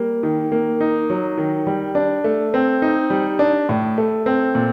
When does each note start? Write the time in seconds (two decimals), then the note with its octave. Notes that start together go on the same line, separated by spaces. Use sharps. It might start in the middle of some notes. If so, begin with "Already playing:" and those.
Already playing: G3 A#3
0.23 D#3
0.52 A#3
0.81 D#4
1.10 F#3
1.37 D#3
1.67 G3
1.95 D4
2.24 A3
2.54 C4
2.82 D#4
3.10 G3
3.39 D4
3.69 A2
3.98 A3
4.26 C4
4.55 A#2